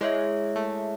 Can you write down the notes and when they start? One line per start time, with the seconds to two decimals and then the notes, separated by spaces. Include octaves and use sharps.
0.01 G#3 E4 G#4 C#5 E5
0.56 A3